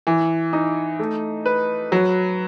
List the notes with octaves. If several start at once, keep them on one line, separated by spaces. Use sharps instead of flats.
E3
D#4
A3
B4
F#3